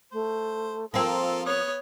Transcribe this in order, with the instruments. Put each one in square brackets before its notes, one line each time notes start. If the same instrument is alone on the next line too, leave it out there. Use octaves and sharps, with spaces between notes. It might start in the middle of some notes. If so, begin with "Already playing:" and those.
[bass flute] A3 [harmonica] C5
[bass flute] F3 [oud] A#3 C4 [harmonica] F4 A4 A#4
[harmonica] B3 D#6 [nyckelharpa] C#5